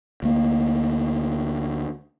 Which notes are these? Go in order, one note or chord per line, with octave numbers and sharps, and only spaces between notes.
D2 A#3